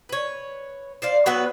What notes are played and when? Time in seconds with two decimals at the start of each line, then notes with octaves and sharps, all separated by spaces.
0.09 B4 C#5
1.02 C5 D5 F5
1.26 F#3 B3 F#4 B4